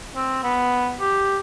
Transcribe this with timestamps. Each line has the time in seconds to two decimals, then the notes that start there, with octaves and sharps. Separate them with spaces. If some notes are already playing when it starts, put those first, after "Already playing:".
0.16 C4
0.44 B3
1.00 G4